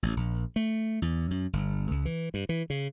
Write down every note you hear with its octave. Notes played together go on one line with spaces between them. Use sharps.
A1
A#1
A3
E2
F#2
G1
C#2
E3
G2
E3
C#3